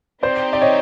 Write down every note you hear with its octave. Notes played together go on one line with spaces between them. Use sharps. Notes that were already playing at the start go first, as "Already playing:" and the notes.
C4 D#4 G4 C5 D5
D5
C#5 D#5